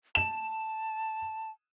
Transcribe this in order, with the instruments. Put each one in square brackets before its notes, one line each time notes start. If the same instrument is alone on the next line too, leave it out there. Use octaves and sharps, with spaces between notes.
[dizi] A5 [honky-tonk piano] E7